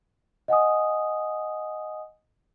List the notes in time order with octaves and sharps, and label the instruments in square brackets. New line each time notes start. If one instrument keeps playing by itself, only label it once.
[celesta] D#5 F#5 G#5 D#6